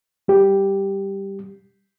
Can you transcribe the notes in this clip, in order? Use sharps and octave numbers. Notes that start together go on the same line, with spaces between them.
G3 G4